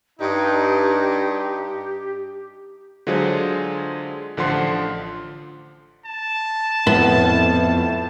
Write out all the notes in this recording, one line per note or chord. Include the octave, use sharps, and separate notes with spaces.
G2 D#4 G4
D3 F#3 G#3 F4 G#4 C5
A1 D3 F3 F#5 C6
A5
F2 A2 B3